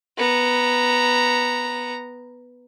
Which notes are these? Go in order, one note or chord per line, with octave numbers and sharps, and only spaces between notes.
B3 A#5